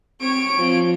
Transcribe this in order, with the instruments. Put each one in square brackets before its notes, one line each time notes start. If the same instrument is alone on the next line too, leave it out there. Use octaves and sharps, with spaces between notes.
[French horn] C4 [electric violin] C#5 D7 [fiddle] C#6
[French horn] F3 [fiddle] C4